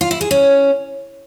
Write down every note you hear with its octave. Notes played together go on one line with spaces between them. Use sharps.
F4
E4
G#4
C#4